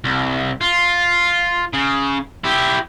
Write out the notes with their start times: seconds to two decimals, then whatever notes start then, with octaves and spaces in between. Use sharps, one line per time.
0.04 C2
0.61 F4
1.73 C#3
2.44 E4 G4